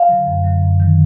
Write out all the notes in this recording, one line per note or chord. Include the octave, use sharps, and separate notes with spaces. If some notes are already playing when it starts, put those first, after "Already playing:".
Already playing: F5
D3 F#3
F#2
D3 F#3
F#2
D#3 F#3